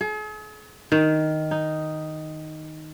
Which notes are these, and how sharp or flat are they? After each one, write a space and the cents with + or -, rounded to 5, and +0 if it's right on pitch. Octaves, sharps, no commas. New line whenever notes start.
G#4 +45
D#3 +0
D#4 +0